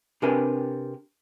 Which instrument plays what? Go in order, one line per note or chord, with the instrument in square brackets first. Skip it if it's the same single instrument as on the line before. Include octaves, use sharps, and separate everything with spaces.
[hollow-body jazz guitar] C3 D4 G4 A#4 B4 G#5